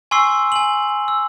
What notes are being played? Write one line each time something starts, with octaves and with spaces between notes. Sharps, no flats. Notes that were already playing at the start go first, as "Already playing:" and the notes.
G#5 C6 C#6 E6 C7
G#5 F#7
E6